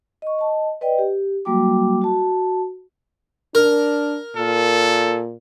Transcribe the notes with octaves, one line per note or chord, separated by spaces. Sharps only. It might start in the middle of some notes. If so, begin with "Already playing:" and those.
D#5 C#6
D#5 A5
B4 D5 D#5 G5
G4
F#3 G3 A#3 F#4 G5 D6
F#4 A5
D4 A#4
A#2 A4